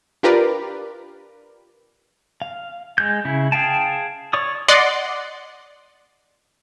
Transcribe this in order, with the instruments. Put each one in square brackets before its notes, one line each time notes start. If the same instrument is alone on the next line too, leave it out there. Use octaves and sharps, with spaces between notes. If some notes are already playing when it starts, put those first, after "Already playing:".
[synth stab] D4 F4 G4 A#4 B4 D5
[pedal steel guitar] F5
G#3 G6
C#3 E4
G#4 F5 G5 A5
C#5 D5 C#6 D#6
[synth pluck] D5 D#5 F#5 C6